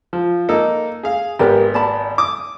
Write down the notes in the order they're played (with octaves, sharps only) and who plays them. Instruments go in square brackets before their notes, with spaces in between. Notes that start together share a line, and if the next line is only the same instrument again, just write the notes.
[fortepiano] F3
A#3 D#4 A4
G#4 F5
[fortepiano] G#1 B3 [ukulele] G4 A#4 B4
[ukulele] D5 A5 B5
[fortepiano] D6 D#6